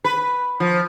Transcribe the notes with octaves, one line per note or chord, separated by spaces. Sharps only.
B4
F3